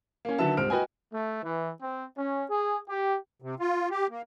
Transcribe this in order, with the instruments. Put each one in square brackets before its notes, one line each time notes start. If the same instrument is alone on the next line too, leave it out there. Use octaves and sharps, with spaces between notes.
[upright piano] A#3 C#4
D3 D#3 F#3 B3 E5 A5
D#1 G#2 C4 F6 D7
F#4 B4 D#5 G5 G#5
[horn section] A3
E3
C4
C#4
G#4
G4
[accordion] C3
F4
G4
A#3